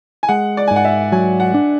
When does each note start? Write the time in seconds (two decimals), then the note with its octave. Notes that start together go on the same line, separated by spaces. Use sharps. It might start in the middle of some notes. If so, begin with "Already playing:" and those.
0.23 G#5
0.29 G#3 F#5
0.57 D5
0.68 G#5
0.71 G#2
0.76 F#5
0.85 E5
1.12 F#3 G#5
1.40 F#5
1.54 D4